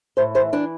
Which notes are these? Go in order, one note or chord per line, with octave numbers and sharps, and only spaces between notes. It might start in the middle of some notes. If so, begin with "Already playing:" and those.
A2 C5
E3 C5
E3 D4